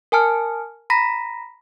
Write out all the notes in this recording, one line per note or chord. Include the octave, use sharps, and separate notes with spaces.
A#4 G#5 A5 F6
A#5 B5 A#6 B6